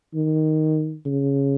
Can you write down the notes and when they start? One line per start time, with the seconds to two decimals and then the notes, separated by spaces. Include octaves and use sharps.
0.14 D#3
1.06 C#3